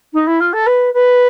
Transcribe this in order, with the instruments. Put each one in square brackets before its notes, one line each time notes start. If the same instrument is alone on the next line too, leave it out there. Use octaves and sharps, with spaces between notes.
[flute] D#4
E4
F4
A4
B4
B4